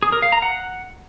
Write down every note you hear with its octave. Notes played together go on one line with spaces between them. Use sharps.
G#4
A#4
F5
A#5
F#5